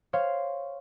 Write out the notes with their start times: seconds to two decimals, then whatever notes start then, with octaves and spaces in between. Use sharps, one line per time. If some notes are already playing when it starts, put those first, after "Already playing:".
0.13 C5 C#5 F5 C6